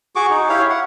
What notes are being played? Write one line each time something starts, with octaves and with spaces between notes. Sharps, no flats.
F#4 G#4 C#6 D6
D#4
E4 G4 C#5 F5
F#5